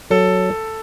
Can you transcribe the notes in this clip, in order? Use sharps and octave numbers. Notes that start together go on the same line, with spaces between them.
F#3 A4